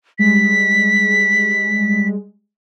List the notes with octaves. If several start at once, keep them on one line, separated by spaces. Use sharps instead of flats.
G3 G#3 B6